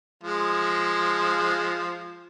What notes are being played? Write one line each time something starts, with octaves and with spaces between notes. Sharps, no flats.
F3 G#3